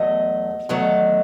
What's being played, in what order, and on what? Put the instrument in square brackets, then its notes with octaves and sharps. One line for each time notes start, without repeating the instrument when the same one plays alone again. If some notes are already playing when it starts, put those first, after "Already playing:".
Already playing: [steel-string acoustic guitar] E2 F#3 A3 D#5
E2 D#3 F#3 A3